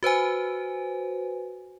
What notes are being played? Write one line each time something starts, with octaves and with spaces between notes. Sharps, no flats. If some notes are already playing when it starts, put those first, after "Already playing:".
F#4 B4 C5 G#5